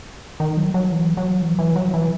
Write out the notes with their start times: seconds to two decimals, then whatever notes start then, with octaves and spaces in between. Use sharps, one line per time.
0.40 D#3
0.57 F#3
0.74 F#3
0.91 E3
1.17 F#3
1.42 E3
1.59 E3
1.76 F#3
1.94 E3